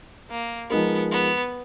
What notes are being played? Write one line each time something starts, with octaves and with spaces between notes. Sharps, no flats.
A#3
F3 G#3 B3 D#4 A#4
B3